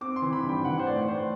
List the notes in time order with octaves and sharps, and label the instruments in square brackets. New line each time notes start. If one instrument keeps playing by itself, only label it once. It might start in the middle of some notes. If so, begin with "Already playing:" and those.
[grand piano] C4 D6
C6
E3
B5
G2
G5
E3 F#5
C5
A2 D5
A2 C5